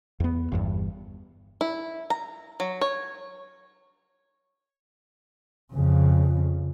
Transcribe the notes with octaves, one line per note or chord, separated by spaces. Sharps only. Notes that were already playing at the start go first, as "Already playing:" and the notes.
E2 B3
G1 E2 G2
E4
A#5
F#3
C#5
F2 C#3